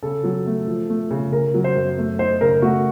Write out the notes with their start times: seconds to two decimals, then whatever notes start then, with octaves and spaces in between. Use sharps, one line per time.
0.03 C#3 A4
0.24 F#3
0.46 A3
0.67 F3
0.89 A3
1.11 C#3
1.32 C#3 A#4
1.54 F#3
1.64 C5
1.76 F#2
1.98 A3
2.19 D#4 C5
2.41 C#3 A#4
2.62 A3 F#4